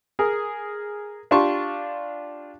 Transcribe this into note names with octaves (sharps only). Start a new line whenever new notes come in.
G#4 A#4
D4 F4 G4 A5 C6 C#6